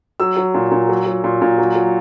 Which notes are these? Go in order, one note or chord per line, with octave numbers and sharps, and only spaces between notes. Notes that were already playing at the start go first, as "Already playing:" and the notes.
F#3 E6
F#3
A#2
A#2
F#3
F#3
A#2
A#2
F#3
F#3